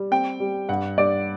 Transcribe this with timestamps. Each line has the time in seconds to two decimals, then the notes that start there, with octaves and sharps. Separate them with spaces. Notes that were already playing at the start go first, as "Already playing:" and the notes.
Already playing: G3
0.11 C4 G5
0.40 G3
0.69 G2 F#5
0.98 G2 D5